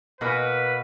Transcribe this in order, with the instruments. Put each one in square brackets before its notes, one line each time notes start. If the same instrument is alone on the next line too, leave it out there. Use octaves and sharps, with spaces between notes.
[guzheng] B2 A#3 A#4 [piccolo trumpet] B4